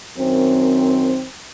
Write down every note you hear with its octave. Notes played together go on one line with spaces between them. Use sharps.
F#2 D#3 C4